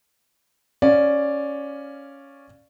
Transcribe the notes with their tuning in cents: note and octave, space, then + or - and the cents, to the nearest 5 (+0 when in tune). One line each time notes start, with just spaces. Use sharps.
C#4 +0 D5 +0 F5 +0